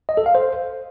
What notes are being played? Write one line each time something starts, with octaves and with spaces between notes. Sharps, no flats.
D#5
A4
F5
C5